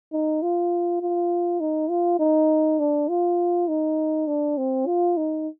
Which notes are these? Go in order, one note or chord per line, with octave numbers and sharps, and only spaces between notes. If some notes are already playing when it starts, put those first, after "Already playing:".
D#4
F4
F4
D#4
F4
D#4
D4
F4
D#4
D4
C4
F4
D#4